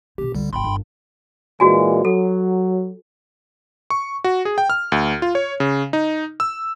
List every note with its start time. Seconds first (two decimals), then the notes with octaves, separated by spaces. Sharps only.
0.18 B2 C4 G4
0.35 C#2 D3 F#3 G3
0.53 D1 G#1 G5 B5 C6
0.64 G1
1.60 A#2 E3 G#3 D4 F#4 G#5
2.05 F#3 A4
3.90 C#6
4.24 F#4
4.45 G#4
4.58 G5
4.70 F6
4.92 D2
5.22 F4
5.35 C#5
5.60 C#3
5.93 D#4
6.40 E6